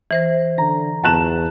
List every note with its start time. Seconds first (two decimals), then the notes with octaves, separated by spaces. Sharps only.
0.11 E3 C5 A#6
0.58 D3 A#5
1.04 E2 A5 F#6 E7